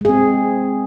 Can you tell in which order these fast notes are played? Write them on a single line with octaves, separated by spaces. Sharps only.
G#3 G#4 C4